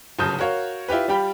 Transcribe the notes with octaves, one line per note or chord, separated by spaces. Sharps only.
G1 F#2 C#3 A5 D#6 G6
F#4 A#4 C#5 F5
E4 F4 G4 B4
G3 F4 G4 G5 B5